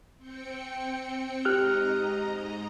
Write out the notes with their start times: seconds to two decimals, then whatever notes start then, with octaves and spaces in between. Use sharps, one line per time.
0.18 C4 G5 C#7
1.45 G#2 G4 D#5 A#5 F6 F#6